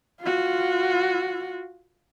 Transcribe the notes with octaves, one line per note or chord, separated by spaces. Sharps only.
F4 F#4